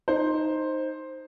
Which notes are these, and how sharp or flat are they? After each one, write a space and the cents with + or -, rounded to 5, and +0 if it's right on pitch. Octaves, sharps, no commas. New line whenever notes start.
D#4 +0 C5 +5